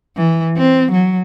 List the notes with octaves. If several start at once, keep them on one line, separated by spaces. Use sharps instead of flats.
E3
C4
F#3